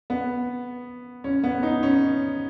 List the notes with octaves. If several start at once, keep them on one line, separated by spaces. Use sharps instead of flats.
B3
C#4
B3
D#4
C#4